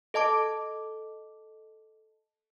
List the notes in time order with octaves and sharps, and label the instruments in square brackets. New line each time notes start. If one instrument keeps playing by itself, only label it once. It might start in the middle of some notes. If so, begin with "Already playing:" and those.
[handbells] A4 D#5 A5 D6